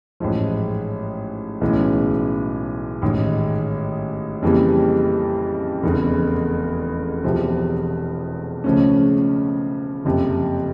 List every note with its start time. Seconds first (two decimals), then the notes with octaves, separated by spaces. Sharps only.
0.20 A1 G#2 F3
1.61 B1 A2 E3 G#3 C#4
3.02 A1 G#2 D#3
4.42 F2 C#3 E3 G3 A#3
5.84 F1 E2 C#3
7.24 E1 E2 C3 F3
8.64 C#2 C#3 F3 A3 C#4
10.05 F#1 F2 C3